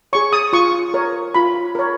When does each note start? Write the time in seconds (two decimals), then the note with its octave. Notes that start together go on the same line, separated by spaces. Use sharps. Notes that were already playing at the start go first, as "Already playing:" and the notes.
0.13 G#4 C#5 C#6
0.33 D#6
0.53 F4 C#6
0.94 A#4 C#5
1.34 F4 B5
1.75 A#4 C#5